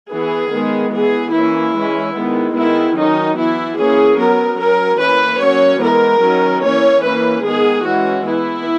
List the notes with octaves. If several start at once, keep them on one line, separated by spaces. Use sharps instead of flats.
E3 B3 G#4
D#3 G#3 B3
E3 B3 G#4
E3 A#3 C#4 E4
E3 G#3 C#4
D#3 G#3 B3
D#3 G#3 B3 E4
D#3 F#3 C#4 D#4
E3 B3 E4
E3 A#3 C#4 G#4
F#3 B3 A#4
F#3 C#4 A#4
E3 A#3 C#4 B4
F#3 A#3 C#4 C#5
E3 G#3 B3 A#4
D#3 F#3 C#4
E3 A#3 C#4 C#5
E3 A#3 C#4 B4
D#3 G#3 B3 G#4
E3 G#3 C#4 F#4
E3 B3 E4